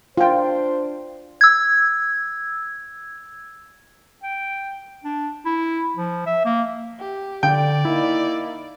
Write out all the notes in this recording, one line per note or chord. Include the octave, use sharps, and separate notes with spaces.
D4 F4 C5 G5
E6 G#6
G5
D4
E4
F3
E5
A#3
G4
D3 D5 G5
A#3 D#4 E4